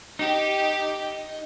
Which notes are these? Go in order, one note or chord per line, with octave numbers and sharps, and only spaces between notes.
D#4 G4